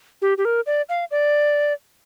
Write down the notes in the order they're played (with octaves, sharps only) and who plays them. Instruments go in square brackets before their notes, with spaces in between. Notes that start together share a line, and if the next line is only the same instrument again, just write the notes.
[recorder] G4
G4
A#4
D5
F5
D5